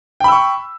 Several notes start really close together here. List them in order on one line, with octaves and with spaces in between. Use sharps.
G5 B5 E6 C#6